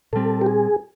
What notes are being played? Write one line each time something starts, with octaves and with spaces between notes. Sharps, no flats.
A#2 G3 C4 A4
G4
G#4